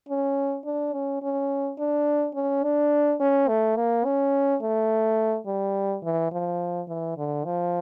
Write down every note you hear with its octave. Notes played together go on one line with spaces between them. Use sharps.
C#4
D4
C#4
C#4
D4
C#4
D4
C#4
A3
A#3
C#4
A3
G3
E3
F3
E3
D3
F3